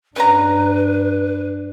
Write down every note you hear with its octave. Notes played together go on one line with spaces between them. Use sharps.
G2 C#3 D4 B4 A#5